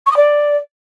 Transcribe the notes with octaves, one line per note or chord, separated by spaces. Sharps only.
C#6
D#6
D5